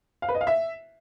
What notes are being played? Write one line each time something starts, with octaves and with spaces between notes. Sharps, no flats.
F5
B4
D#5
F5
E5